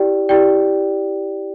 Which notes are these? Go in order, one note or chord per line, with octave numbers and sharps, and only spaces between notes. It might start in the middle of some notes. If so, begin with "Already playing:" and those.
Already playing: E4 G4 D5 G5
E4 G4 D5 G5